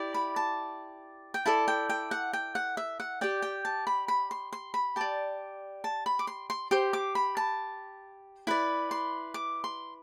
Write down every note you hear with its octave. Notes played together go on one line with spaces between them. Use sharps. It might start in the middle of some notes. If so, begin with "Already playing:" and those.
Already playing: E4 G4 D5
B5
A5
G5
E4 A4 D5 A5
G5
G5
F#5
G5
F#5
E5
F#5
G4 D5 G5
G5
A5
B5
B5
C6
C6
B5
G4 D5 A5
A5
B5
D6
C6
C6
G4 C5 C6
D6
B5
A5
E4 B4 D5 B5
C6
D6
C6